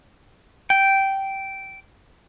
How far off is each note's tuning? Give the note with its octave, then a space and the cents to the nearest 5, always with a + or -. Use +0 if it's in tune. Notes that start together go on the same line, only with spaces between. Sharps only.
G5 -10